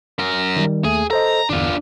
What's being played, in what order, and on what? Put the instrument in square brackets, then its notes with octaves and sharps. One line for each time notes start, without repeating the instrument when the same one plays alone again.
[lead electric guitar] F#2 A#4
[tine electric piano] D#3 G3
[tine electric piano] D#2 A3 [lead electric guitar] G#4
[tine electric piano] A4 C5 D#5 [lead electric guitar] A#5
[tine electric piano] G1 E2 [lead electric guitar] D4 F4